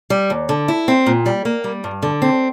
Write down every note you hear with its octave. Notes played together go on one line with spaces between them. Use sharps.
G3
D#2
D3
E4
C4
A#2
G3
A#3
G3
G2
D3
C4